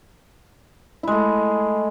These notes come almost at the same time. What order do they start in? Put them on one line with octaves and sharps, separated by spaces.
E4 G#3 A3